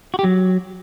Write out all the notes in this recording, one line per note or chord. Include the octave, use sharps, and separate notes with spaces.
F#4
G4
F#3